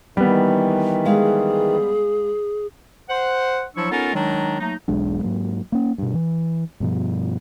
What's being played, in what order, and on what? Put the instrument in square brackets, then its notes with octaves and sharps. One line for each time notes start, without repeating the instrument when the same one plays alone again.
[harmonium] D#3 E3 [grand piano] G3 B3 [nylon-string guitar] A#3
[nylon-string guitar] G#3 F5 [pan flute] G#4
[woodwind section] C5 F#5
F3 F#3 D4 E4 C#6 E6
B3 C#4 D#4 F4 A4 A#4
D#3 F#3 G#3 D4 D#4
F#3 A3 A#3 D#4
[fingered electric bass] E1 B1 G#3 D4
G#2 F#3 A#3
A#3 C#4
G2 B2
E3
G2 B2 F3